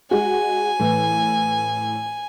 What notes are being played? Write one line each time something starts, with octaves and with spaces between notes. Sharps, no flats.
G#3 F#4 G#5
A2 E3